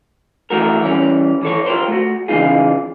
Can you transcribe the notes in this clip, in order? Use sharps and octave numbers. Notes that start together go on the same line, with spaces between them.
E3 A3 F#4 A#4
E3 G3 C#4
E3 A4 C#5
F4 G4 A#4 C5
A3 F#4
C#3 E3 B3 D#4 F4 G#4